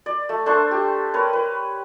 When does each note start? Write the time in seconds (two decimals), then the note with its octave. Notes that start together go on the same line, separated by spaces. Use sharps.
0.06 D5
0.29 A3
0.46 A3 D4 C5 C#6
0.71 G4
1.14 A#4 B4 C#5
1.33 B4